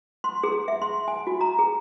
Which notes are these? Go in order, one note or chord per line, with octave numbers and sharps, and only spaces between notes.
C6
G#4
E5
C6
G#5
F#4
A#5
G#4